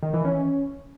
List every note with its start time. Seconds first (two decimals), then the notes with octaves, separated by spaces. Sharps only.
0.03 D#3
0.14 E3
0.25 C#4